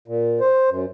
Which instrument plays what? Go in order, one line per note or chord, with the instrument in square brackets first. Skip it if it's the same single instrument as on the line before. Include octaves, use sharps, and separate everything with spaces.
[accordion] A#2
C5
F#2